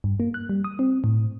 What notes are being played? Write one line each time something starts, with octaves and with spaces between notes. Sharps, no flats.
G2
A#3
F#6
G3
D#6
C4
A2